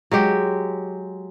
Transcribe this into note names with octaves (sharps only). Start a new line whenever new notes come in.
F#3 G#3 G4